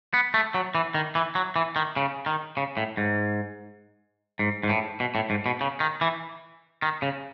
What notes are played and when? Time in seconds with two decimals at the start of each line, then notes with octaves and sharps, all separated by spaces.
0.14 B3
0.34 A3
0.54 F#3
0.75 E3
0.94 D#3
1.15 E3
1.35 F#3
1.56 E3
1.76 D#3
1.96 C#3
2.26 D#3
2.57 C#3
2.77 A2
2.97 G#2
4.39 G#2
4.63 G#2
4.69 A2
5.00 B2
5.15 A2
5.30 G#2
5.46 B2
5.61 C#3
5.80 D#3
6.01 E3
6.82 D#3
7.02 C#3